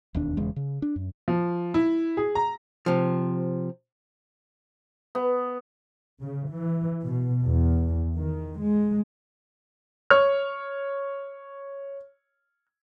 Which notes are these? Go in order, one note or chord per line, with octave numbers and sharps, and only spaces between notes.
E1 D#2 D4
E1 E2 C#3 G#3
C#3
D4
F#2
F3
E4
G#4
A#5
C3 F3
B3
C#3
E3
B2
E2
D#3
G#3
C#5 F6